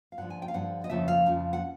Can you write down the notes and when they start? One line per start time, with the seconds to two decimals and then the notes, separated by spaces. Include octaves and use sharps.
0.12 F5
0.18 G2 D3 F3 F#5
0.30 G#5
0.42 G5
0.48 F5
0.54 G2 D3 F3 F#5
0.84 D#5
0.90 F2 C#3 F3 A3 E5
1.08 F5
1.26 F2 C#3 F3 A3
1.53 F#5